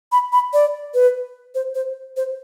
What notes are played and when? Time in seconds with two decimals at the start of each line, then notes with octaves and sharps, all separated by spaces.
0.12 B5
0.32 B5
0.53 D5
0.94 B4
1.55 C5
1.75 C5
2.17 C5